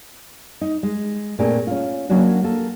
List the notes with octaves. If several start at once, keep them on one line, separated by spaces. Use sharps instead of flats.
D#4
G#3
A#2 A3 C4 D4 G#4 A#4
C#4 F4
F#3 A#3 C#4 D4 F#4
A#3 A4